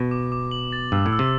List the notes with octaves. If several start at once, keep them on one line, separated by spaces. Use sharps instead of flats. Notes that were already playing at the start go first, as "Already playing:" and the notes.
Already playing: B2
D6
D6
F#7
A6
G2 E6
A2
E6
C3